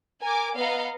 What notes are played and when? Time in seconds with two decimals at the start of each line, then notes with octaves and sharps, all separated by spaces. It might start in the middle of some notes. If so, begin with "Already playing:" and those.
0.23 A#4 G#5 D6
0.56 B3 D#5 F5 F#5 A#5